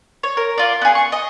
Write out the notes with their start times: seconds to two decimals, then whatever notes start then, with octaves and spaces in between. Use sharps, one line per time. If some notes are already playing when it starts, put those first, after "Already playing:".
0.23 C#5
0.37 A#4
0.58 F4 D5
0.81 B3 G#4
0.95 C#6
1.12 D#5